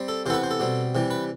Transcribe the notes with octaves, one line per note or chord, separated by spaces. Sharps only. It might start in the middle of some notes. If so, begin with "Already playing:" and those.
Already playing: G3 C4
A4
C3 E3 B3 A4 C5
B4
C5
A4
B2 G3 C4
C3 E3 G3
B4